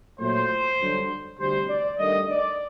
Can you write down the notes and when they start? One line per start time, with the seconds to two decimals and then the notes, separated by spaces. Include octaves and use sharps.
0.19 A#2 F#3 A3 C5
0.79 G2 D3 F#3
1.38 D2 C3 G3 C5
1.68 D5
1.98 G2 D#3 A3 D#5
2.28 D5